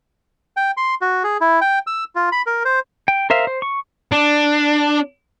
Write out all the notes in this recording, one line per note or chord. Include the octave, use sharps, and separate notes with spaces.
G5
C6
F#4
G#4
E4
G5
E6
F4
B5
A#4
C5
G5
A#4 C5 E5 F5
C5
C#6
D4